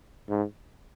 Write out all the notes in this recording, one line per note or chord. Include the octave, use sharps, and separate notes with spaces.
G#2